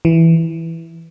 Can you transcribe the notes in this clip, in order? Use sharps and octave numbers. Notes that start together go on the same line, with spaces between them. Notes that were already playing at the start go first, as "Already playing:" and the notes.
E3